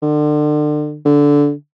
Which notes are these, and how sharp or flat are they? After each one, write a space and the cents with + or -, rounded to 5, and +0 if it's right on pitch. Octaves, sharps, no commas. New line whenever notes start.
D3 +35
D3 -15